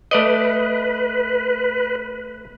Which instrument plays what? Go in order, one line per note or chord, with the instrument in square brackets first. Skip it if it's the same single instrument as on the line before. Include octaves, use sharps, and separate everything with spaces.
[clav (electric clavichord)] A3 D5 D#5 [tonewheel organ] B4